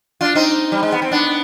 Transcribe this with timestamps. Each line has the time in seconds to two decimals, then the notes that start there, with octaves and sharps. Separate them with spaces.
0.21 D4 F4
0.35 C4 D#4
0.72 G3
0.83 G#3
0.92 B3
1.02 C4
1.11 B3 D4